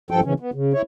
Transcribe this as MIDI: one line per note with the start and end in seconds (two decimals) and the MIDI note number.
0.11 0.21 43
0.11 0.21 53
0.11 0.21 69
0.11 0.21 79
0.24 0.34 44
0.24 0.34 49
0.24 0.34 52
0.24 0.34 61
0.40 0.51 59
0.54 0.73 49
0.73 0.82 64
0.73 0.82 73